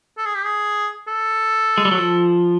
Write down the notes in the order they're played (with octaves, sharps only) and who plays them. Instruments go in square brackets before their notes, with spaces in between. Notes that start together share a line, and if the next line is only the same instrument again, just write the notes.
[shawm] A4
G#4
G4
G#4
A4
[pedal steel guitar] G#3
G3
F#3
F3